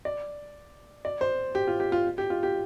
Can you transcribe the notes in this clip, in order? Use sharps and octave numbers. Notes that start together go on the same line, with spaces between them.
D5
D5
C5
G4
F4
G4
F4
G4
F4
G4